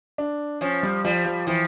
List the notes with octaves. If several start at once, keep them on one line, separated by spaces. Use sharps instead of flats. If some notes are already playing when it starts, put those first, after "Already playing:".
D4
F3 C#4
G3
F3 G3
F3
E3 F3